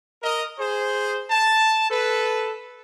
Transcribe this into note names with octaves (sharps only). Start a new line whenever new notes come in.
A#4 D#5
G#4 C5
A5
A4 B4